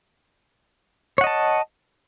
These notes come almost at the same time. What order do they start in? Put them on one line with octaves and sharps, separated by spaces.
C#5 F#5 D#5 A5